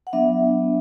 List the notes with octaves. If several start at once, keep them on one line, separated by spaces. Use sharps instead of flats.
F#5
F#3 B3 D4 E5